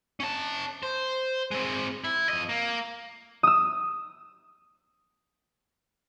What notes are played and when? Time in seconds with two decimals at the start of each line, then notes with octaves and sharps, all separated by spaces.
0.20 C#4 A5
0.83 C5
1.51 G#3 C4
2.04 E4
2.29 F2 D#5
2.49 A#3
3.43 D#6 E6